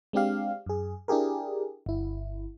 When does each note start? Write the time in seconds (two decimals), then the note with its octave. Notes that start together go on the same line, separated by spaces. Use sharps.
0.13 G#3 C4 D4 G4 F5
0.66 F#2 G#4
1.08 D4 E4 G4 G#4 A#4
1.86 G1 E4